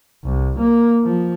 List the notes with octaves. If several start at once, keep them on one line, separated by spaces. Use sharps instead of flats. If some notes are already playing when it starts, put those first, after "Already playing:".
C2
A#3
F3